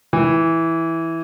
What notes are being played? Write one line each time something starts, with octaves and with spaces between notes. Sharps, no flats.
E3